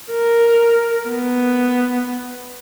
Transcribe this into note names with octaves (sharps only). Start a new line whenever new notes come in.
A#4
B3